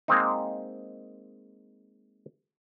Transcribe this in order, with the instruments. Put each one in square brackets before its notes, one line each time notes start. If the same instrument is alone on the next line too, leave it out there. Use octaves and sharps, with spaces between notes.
[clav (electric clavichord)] G#3 A#3 C4 D#4